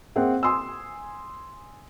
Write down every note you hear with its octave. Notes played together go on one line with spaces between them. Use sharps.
A#3 C4 G#4 C5 E5 F#5
G#5 C6 D#6 E6